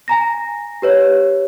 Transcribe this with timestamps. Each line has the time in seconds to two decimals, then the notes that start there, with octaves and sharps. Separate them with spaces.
0.08 G#5 A#5 A#6
0.82 G4 B4 C#5